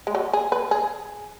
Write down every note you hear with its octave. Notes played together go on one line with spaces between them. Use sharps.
G#3
F#3
G#4
B4
G#4